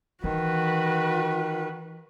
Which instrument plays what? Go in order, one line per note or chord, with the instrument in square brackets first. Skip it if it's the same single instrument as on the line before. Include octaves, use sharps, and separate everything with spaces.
[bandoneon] D#3 [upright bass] E3 [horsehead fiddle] F#4 B4